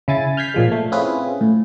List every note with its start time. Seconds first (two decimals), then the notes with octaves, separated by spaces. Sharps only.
0.08 C#3 E4 G#5 A6
0.37 F6 G6 G#6 B6 C7
0.54 A#2 F3 G#3
0.72 A3
0.92 C4 C#4 E4 F4 G#4 B4
1.41 A2